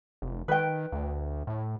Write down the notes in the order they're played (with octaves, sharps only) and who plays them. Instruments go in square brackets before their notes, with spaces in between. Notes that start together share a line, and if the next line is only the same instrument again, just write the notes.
[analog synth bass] F1
[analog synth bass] D#3 [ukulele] B4 G5
[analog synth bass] D2
A2